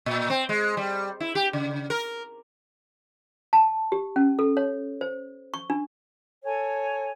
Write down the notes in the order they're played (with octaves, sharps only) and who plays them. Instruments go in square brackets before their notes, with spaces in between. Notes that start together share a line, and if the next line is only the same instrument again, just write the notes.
[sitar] A#2
C4
G#3
G3
E4
G4
C#3
A#4
[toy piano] A5
G4
C#4
A4
C#5
C5
C#6
D4
[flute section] A4 C#5 G#5